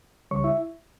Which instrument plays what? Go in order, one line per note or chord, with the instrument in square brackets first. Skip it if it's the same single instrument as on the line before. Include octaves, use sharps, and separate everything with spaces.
[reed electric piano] C#2 C#3 G3 C#5 C#6
E4 E5